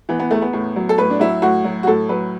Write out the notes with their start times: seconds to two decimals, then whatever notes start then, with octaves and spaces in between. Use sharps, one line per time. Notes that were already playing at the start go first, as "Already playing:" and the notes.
0.09 E3 B3
0.19 B3
0.31 E2 A3
0.42 B3
0.53 A2
0.76 F#3
0.89 A4
0.98 A2 B4
1.10 D4
1.20 F#3 E4
1.42 A2 F#4
1.65 F#3
1.83 F#4
1.87 A2 A4
2.09 F#3 B4